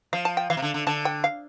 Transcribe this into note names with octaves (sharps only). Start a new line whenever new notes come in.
F3 F5
A5
G5
E3 F5
C3
D3
D3
D3 A5
G5
F5